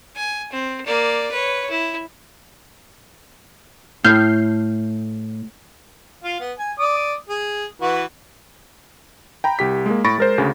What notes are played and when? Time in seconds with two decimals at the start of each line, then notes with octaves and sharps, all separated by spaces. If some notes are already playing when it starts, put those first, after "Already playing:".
0.16 G#5
0.52 C4
0.86 A#3 D5
1.31 B4 C#5
1.70 E4
4.04 A2 F6 G6 C7
6.24 F4 F5
6.40 B3
6.59 G#5
6.79 D5 D#6
7.29 G#4
7.81 E3 F#4 B4
9.44 G5 A#5 B5
9.59 C2 G4 B6
9.86 G#3 A#3
10.04 A2 B5 C#6 A6 A#6 D7
10.18 G#3 A#4 C5
10.38 D2 C#3